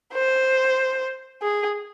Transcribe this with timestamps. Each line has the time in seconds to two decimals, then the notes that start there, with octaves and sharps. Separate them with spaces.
0.13 C5
1.43 G#4